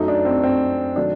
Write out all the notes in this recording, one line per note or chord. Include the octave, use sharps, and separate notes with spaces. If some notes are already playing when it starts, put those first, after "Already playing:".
Already playing: F#2 F#3 A3 D#4
D4
C4
C4
C3 D#3 F#3 A3 D4